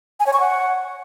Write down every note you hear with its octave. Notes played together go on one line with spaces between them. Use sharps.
G#5
C#5
C#6
F#5